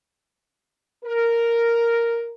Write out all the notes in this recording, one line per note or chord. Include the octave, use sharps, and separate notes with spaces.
A#4